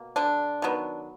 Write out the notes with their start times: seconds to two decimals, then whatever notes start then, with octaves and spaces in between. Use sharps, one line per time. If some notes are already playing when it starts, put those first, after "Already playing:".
Already playing: B2 A#3
0.16 D3 D4
0.62 D#3 F#3 B3